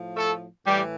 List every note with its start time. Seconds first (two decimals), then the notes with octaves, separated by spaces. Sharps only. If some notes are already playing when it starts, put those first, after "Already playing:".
Already playing: A2 F3
0.16 A3 A4
0.66 A2 E3 G3 G4